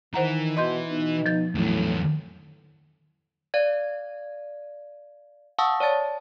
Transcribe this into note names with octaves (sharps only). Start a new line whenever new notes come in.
D#3 E3 C5 F#5 A#5
B2 D#5 C6 G6
B2 D#4
F3 G6 A6
E2 A2 F#3
D5 F5 G#6
F5 F#5 A5 C#6 D#6 E6
C#5 D5 A5 A6